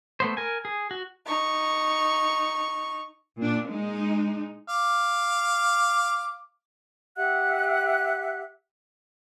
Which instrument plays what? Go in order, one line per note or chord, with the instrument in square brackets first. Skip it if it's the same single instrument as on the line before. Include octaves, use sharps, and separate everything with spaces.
[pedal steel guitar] A3 B3 C5
A#4 G#5
G#4
F#4
[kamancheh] D#4 C#6
[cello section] A#2 D4
G#3 D#4
[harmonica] F5 D6
[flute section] G4 E5 F#5 F#6